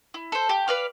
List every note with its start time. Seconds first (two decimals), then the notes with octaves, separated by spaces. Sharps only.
0.14 E4
0.32 A4 C5
0.49 G4
0.68 B4 D5 F5